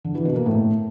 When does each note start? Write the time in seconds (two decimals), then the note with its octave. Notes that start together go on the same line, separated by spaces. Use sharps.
0.04 D3
0.15 E3
0.25 B2
0.36 A#3
0.46 A2